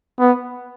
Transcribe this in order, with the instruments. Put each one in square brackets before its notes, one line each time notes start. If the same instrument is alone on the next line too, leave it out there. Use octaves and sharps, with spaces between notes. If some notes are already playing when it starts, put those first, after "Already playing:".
[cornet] B3